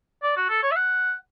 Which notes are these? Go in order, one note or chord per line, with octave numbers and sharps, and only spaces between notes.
D5
F#4
A4
C#5
E5
F#5